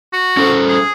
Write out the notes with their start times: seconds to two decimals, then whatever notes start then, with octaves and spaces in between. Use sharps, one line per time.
0.13 F#4
0.37 C#4 A4 C5
0.68 G#4